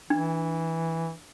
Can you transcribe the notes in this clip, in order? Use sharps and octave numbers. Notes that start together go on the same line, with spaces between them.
E3 D4